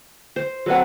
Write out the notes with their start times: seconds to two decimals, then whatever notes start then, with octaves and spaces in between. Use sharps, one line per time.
0.36 C5
0.66 F#3 C4 A4 B4 F#5